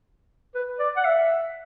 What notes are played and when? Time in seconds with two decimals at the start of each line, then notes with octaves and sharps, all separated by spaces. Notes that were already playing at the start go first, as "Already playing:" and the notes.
0.55 B4
0.80 D5
0.97 F#5
1.05 E5